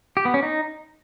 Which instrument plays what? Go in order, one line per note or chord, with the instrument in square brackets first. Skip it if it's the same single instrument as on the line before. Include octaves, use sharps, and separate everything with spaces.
[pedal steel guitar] G4
B3
C#4
D#4